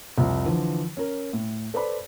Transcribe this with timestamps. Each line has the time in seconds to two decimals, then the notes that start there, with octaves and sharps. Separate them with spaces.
0.18 C2 F2
0.45 D3 E3 F3
0.97 C#4 A#4
1.33 A2
1.74 A4 B4 C5 D5 B5